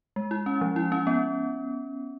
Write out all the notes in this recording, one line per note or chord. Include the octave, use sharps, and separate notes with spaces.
G#3
E4
C#4
F3
E4
C#4
B3